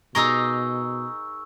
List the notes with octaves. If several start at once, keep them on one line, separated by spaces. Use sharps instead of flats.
B2 D#4 G#4 A#4 C#6 E6